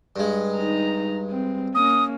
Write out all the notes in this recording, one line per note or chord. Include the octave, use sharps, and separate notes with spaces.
G2 G#3
D#4 A#5
C4
A#3 C#4 D#6